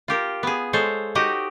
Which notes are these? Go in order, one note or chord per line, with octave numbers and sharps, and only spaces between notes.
F4 G4 A#4
B3 G#4
G#3 A4 C5 C#5
D#4 F#4 G4 D#5